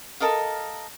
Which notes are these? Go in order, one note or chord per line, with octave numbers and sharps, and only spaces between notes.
A4 A#4 D#5 F5